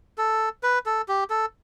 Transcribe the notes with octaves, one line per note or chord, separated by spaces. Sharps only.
A4
B4
A4
G4
A4